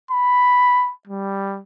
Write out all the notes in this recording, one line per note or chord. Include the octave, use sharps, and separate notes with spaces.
B5
G3